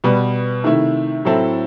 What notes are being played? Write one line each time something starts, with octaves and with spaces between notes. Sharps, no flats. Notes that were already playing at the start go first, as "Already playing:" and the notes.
B2 G3 B3
C3 D#3 A3 E4
A2 F#3 C4 E4 A4